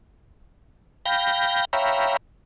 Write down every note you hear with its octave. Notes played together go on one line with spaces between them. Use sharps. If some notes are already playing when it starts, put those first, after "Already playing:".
F5 G5 B5 G6 A#6
C#5 E5 F5 G5 A#5 B5